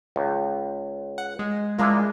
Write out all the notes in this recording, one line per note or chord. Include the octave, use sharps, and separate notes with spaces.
C#2
F#5
G#3
G#3 A#3 D4 E4 F4